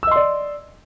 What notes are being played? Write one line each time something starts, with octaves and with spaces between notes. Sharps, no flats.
D5 D#5 C6 E6